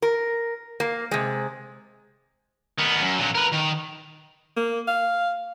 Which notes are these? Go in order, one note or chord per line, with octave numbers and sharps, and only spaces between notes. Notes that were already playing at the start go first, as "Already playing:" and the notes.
A#4
A#3
C3 G#3
D#3 B3
F#2
A#2 F#3
A#4 B4
D#3
A#3
F5